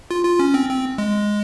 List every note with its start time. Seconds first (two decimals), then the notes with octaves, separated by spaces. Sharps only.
0.11 F4
0.25 F4
0.39 C#4
0.54 C4
0.69 C4
0.98 G#3